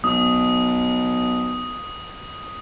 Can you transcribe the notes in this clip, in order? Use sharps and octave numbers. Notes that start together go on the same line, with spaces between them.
B1 D#6